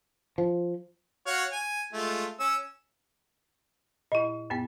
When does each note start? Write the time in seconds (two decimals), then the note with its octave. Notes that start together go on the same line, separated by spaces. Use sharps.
0.38 F3
1.26 F#4 C#5 F5
1.52 G#5
1.93 G#3 A3 F4
2.40 C#4 E6
4.12 A#2 E4 D#5
4.50 F#2 A#2 B3